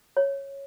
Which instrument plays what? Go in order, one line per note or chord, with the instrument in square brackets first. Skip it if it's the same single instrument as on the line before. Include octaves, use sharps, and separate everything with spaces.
[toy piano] C#5